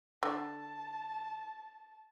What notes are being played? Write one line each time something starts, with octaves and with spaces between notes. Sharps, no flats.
D3 A5